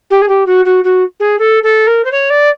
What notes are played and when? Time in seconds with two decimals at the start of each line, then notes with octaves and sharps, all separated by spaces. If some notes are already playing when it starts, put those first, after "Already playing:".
0.10 G4
0.22 G#4
0.28 G4
0.46 F#4
0.65 F#4
0.84 F#4
1.20 G#4
1.39 A4
1.63 A4
1.87 A#4
2.05 C5
2.12 C#5
2.30 D5